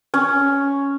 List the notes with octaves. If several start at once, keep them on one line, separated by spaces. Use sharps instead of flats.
C#4